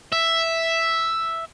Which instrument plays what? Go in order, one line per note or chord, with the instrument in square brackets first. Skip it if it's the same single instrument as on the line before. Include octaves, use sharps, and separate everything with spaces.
[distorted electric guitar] E5